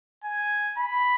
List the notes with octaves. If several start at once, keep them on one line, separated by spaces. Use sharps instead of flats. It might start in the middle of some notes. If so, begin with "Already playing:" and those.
G#5
B5